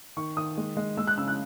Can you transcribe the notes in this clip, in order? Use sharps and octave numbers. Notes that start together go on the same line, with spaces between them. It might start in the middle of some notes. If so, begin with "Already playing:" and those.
D#3 C#6
D#3 D#6
G#3
G#3
G#3 E6
F#6
C#3 E6
F#6